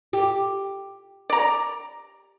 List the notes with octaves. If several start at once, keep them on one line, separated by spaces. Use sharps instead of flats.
G4
D5 A#5